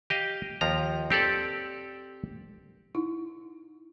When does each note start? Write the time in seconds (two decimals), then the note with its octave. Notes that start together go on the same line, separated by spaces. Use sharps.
0.10 G4 D#5 F5
0.61 D#2 F3 A#5
1.10 C4 G4 A4 D5
2.95 D#4 E4